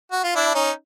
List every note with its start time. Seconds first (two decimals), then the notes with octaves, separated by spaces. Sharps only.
0.12 F#4
0.24 F4
0.35 D4 E4
0.55 C#4 D#4